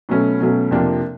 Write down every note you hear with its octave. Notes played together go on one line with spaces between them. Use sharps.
B2 F#3 A3 C#4
B2 F#3 A3 C#4
F2 C3 F3 A#3 D4